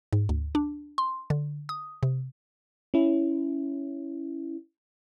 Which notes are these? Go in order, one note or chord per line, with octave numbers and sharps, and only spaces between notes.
G#2
D2
D4
C6
D3
D#6
C3
C#4 E4